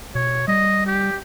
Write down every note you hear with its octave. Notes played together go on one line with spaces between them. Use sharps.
B2 C#5
G3 D#5
G4